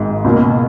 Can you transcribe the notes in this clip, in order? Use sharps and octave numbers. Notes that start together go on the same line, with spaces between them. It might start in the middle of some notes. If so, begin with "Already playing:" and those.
Already playing: G#1 G#2 D#3
C#2 B2 A#3